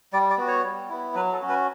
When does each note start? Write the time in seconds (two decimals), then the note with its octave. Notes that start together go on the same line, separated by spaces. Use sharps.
0.13 G3 D5
0.30 D5
0.38 B3 F#4
0.47 C#5
0.64 G3
0.89 B3 E4
1.15 F#3 B4
1.33 A4
1.42 C#4 F#4
1.49 B4